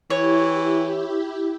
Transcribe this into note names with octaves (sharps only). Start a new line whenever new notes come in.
E3 E4 G4 C#5